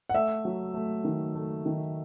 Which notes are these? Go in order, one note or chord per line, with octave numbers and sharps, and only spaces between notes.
F#5
A3 E5
F#3
A3
D#3
A3
D#3